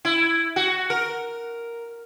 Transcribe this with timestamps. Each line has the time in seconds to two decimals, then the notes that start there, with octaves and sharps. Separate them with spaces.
0.05 E4
0.56 F#4
0.90 A#4